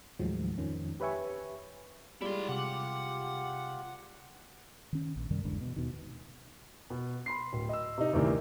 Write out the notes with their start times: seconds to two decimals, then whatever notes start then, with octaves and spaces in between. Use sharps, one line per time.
0.19 D#2 A2 D#3 F3 F#3 G#3
0.58 F2 D#3 F3 C#4
1.00 G4 B4 C#5 E5 G#5 C#6
2.22 G3 G#3 E4 F4 D5 C6
2.49 C3 F4 G4 F#5 D6
4.93 D#3 C#4
5.16 A#1
5.30 F#2 C3 D#3 G3
5.45 G1 E2 G#2 D3
5.61 B2
5.76 D#2 B2 D#3
6.90 B2
7.26 B5 C6 C7
7.53 D1
7.69 D#5 E6
7.98 C3 D#4
8.13 D2 G2 C3 D#3 E3